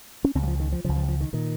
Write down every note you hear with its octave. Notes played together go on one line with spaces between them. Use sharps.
C#4
C#2 C#3 C4
G3
F3
D#3
F3
C#2 C#3 F3
F3
F3
D#3
A#2 D#3